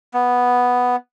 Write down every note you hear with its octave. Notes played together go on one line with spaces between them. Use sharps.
B3